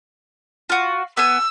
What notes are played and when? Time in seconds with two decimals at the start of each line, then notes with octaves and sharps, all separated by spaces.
0.70 F4 F#4
1.17 B3 G#5 E6